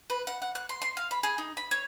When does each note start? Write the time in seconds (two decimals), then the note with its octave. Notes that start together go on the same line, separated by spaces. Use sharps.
0.10 B4
0.27 F#5
0.42 F#5
0.55 F#6
0.69 C6
0.82 C6
0.97 F5
1.11 B5
1.23 G#4
1.38 D#4
1.57 B5
1.71 C#5